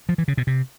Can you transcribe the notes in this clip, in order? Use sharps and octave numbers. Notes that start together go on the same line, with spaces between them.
F3
E3
C#3
B2
C3